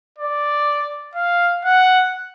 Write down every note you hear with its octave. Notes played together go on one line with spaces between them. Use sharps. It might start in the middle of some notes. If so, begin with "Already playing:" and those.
D5
F5
F#5